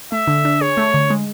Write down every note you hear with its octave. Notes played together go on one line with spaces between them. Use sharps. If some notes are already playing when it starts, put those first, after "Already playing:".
A3 E5
D3
D4
G#4 C#5
A3
D3
G#3